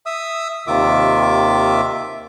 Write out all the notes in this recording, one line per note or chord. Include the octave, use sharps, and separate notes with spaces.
E5 D#6 E6
D#2 C3 D#3 F4 E5 D6